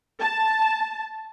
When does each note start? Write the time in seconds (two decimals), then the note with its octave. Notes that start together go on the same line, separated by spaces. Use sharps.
0.20 A5